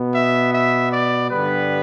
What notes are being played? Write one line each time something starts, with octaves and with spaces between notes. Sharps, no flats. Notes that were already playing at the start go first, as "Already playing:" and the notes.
Already playing: B2 B3
E5
E5
D5
G2 D3 G3 B3 B4